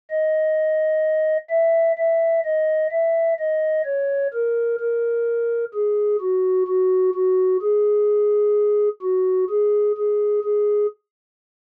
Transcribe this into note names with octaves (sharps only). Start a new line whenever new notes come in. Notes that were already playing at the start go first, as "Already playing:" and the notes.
D#5
E5
E5
D#5
E5
D#5
C#5
A#4
A#4
G#4
F#4
F#4
F#4
G#4
F#4
G#4
G#4
G#4